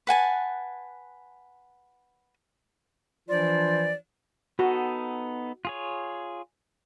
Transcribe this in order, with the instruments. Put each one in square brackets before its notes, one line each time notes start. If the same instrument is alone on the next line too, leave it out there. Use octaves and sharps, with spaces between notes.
[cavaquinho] B4 F#5 G#5 A5
[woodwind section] E3 F3 D4 F4 C5 D5
[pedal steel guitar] B3 D#4 A4 [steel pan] F#4
[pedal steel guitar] F4 G#4 C#5